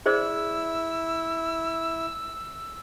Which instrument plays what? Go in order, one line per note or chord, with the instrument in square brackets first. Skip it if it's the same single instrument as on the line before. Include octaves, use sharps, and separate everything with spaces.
[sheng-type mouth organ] E4 [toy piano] G#4 C5 D5 [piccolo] E6